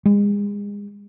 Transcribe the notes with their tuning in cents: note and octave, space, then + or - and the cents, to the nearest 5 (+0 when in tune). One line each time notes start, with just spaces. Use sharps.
G#3 -35